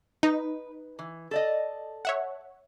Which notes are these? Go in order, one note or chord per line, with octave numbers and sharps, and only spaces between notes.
D#4 B4
E3
A4 D5 D#5
C#5 E5 F#5